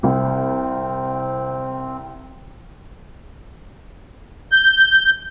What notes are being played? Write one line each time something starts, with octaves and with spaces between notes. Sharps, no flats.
C2 C4
G6